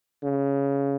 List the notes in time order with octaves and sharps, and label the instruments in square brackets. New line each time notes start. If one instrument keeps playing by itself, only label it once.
[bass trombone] C#3